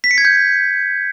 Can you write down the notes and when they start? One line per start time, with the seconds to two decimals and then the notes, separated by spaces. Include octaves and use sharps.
0.04 B6
0.11 C#7
0.18 G#6
0.25 G6